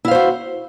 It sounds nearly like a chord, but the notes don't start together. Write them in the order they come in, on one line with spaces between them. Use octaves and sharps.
E4 F5 C5 F#4